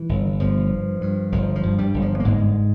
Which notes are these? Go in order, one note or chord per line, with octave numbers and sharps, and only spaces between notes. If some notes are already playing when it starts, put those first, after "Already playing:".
Already playing: E3
G1
G1 F3
G2
G2
G1 F3
F3
G2
G2 G3
G1
F3
A#3
G1 G#2 G#3